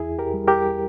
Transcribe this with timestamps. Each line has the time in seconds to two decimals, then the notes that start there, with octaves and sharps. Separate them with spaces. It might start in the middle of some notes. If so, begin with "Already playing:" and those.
Already playing: E2 E4 G#4
0.19 G4 A#4
0.34 G3
0.48 G4 A#4